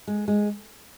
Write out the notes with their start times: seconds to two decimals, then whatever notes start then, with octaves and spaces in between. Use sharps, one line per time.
0.07 G#3
0.28 G#3